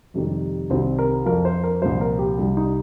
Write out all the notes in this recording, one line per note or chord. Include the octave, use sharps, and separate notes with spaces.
F2 C3 D#3 G3
C2 C3 D#3 G3 C4
A#4
F2 F3 A#4
C5
A#4
C2 A#2 F3 C5
A#4
G4
C2 C3 G3
D#4